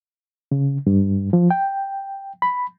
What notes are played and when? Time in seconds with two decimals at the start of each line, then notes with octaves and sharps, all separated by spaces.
0.52 C#3
0.87 G2
1.33 F3
1.51 G5
2.42 B5